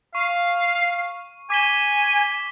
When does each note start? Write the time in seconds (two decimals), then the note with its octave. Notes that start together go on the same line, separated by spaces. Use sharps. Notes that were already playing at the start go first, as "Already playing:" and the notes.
0.15 F5 C#6
1.50 G#5 D6 B6 G7